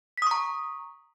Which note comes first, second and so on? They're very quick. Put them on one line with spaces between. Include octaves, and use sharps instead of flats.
B6 D#6 C#6 A#5